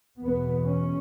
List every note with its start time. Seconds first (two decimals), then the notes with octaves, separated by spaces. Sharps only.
0.21 E2 B2 B3
0.67 C#4